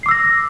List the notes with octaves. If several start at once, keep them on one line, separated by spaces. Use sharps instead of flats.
D6 E6 A#6 C7